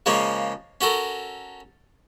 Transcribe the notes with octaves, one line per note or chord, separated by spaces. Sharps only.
C#3 F3 G#3 A#3 C#4
C#4 F#4 A4 A#4